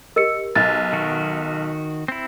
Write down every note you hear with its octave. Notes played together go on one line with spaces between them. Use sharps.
G4 A#4 D#5 E6 C#7
B1 A6
D#3 F#4
C4 E4